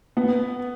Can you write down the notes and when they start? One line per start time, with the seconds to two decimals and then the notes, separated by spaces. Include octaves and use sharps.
0.17 B3